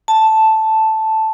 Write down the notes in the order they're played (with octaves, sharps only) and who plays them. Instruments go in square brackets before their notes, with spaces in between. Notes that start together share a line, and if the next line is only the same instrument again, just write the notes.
[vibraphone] A5